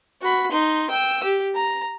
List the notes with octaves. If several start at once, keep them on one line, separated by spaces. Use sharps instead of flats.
F#4 B5
D#4 C6
G5 E6
G4
A#5